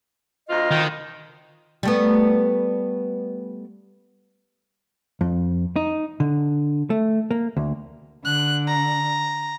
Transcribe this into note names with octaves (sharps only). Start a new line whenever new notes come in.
D2 C4 F4 D#5
D#3
G3 A3 B3
F2
D#4
D3
A3
A#3
D2
D3 F#6
A#5